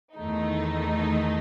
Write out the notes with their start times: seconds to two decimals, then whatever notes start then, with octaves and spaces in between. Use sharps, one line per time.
0.15 E2 D#3 A3 D#4